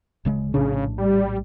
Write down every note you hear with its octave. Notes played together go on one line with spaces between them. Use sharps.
D1 C#3 G#3
A#1 A2 C#3 D4
G3